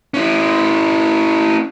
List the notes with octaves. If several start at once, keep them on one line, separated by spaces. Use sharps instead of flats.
C#4 E4